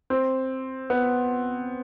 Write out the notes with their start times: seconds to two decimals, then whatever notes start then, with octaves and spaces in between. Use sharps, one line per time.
0.10 C4
0.90 B3